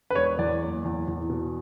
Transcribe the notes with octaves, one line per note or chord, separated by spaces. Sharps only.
B4
E1 C#5
E2 D5
F#1
E2
E2
B2